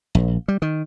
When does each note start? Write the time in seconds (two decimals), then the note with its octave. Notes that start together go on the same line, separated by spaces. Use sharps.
0.15 A#1
0.48 G3
0.62 D#3